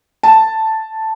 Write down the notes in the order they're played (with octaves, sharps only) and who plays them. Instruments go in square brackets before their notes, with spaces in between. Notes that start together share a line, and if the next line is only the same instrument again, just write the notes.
[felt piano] A5